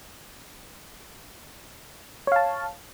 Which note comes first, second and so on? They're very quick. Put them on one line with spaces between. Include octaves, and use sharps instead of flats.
C#5 F5 A5